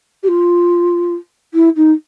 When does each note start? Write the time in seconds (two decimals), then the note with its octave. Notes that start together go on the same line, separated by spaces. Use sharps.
0.23 G4
0.28 F4
1.54 E4
1.76 D#4